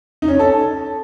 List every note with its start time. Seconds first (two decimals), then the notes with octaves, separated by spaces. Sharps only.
0.22 D#4
0.28 C#4
0.34 C#5
0.39 A4